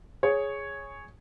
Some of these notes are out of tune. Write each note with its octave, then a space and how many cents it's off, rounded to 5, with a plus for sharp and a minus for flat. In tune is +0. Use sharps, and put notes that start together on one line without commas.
G#4 +0 C#5 +0